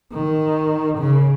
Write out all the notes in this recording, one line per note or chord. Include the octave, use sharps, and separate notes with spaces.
D#3
C#3